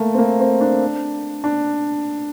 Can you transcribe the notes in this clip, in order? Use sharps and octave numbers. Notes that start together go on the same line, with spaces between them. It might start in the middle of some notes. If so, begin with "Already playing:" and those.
Already playing: A3 A#3
C4
A#3
C4
D4
D4